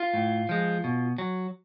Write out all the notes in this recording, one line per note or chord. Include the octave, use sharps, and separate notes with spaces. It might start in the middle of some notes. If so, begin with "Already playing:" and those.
Already playing: F4
A2
F3 G#3
B2
F#3